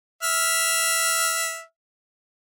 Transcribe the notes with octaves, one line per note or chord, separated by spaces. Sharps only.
E5 F6